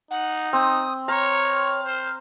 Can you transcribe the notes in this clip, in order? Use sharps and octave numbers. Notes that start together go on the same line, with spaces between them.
D#4 F#5
C4 D#6
C#5 A#5 F6
C5